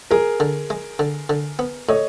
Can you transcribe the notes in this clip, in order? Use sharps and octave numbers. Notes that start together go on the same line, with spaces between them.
G#3 G#4 A#4
D3
G#3
D3
D3
B3
A2 C#5 D#5